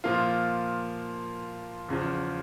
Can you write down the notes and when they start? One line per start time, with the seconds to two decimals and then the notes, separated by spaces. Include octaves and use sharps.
0.04 A#2 F3 A#3 F4
1.89 E2 C#3 F3